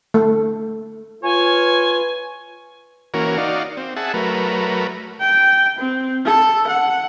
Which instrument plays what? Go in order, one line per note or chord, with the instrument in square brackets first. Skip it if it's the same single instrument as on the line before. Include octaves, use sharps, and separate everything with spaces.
[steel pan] A3
[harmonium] F4 [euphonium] B4 [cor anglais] C#5 [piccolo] G#5
[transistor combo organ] E3 A#3 C#4 F#4 A#4
D#4 F#4 D5 F5
C4
G#4 E5 F#5 A5
F#3 A3 A#4 B4
[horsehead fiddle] G5
C4
A4
F#5